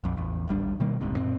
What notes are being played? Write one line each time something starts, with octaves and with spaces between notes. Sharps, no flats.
A#1 F2
A1 E2
D1 G#1 G3 D4
B2 D#3 G3 A#3
D#1 C2 G#2 C3
F#2 A#2 C4